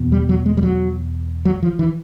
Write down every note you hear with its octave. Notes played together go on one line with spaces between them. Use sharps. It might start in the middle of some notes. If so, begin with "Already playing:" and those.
Already playing: E2 B2
G3
F#3
G#3
G3
F#3
F#3
F3
E3